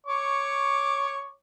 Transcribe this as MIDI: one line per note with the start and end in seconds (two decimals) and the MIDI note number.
0.07 1.30 73
0.07 1.30 85
0.07 1.30 86